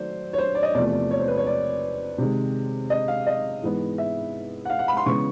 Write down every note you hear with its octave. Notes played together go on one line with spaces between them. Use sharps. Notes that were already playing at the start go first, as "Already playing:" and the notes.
Already playing: D#3 F#3 A3 C5 D5
C#5
C5
D5
D#5
E2 C3 F3 A3 D5
D5
C#5
C5
B4
C#5
D5
C3 D#3 G#3
D#5
F5
D#5
G#2 E3 G#3 B3
E5
F#5
F5
F#5
B5
C6
C#3 E3 G#3 B3 C#6